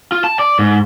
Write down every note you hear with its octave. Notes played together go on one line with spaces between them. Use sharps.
F4
A5
D5
G#2